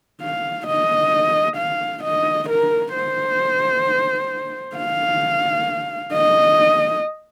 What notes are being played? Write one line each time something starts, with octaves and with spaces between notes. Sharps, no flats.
F5
D#5
F5
D#5
A#4
C5
F5
D#5